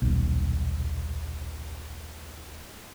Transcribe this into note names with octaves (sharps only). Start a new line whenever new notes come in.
D#1 B1